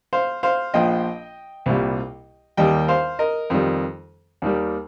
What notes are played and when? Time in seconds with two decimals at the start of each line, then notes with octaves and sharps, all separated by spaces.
0.13 C5 F5
0.43 C5 F5
0.74 A#1 A#2 F3 D#5 G5
1.66 C2 A#2 G3
2.57 D#2 D#3 G3 D#5 G5
2.88 C5 F5
3.19 A#4 D#5
3.50 F2 D#3 G3
4.42 D#2 D#3 G3